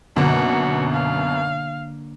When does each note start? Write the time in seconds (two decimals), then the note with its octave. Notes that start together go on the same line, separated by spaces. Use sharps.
0.16 F#2 B2 D3 A#3 F#4
0.93 F5